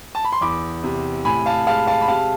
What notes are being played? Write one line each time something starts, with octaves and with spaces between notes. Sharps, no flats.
A5
B5
C6
E2 B5 D6
C3
A2 G#5 B5
F5 A5
G#3 F5 A5
F5 A5
B5
C3 F5 A5